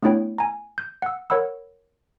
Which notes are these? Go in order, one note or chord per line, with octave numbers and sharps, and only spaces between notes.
A3 B3 D4 E4 C#5 G5
G#5 A#5
G6
F#5 E6
A#4 C#5 F#5 B5 E6